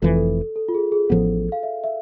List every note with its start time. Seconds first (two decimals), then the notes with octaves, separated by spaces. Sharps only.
0.02 F1 F2 E3 A4
0.16 A4
0.56 A4
0.69 F4
0.75 G#4
0.92 G#4
1.10 A1 A2 F3 B3 A4
1.52 F5
1.63 E5
1.84 E5